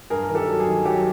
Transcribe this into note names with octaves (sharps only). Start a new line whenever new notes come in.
G2 G#4 A#4
A#4
D#3
G4 A4
F#3
G#4
D#3
F#3 G4